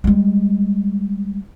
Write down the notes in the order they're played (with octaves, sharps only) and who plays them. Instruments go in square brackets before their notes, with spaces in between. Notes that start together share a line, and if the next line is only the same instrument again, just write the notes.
[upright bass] G3 G#3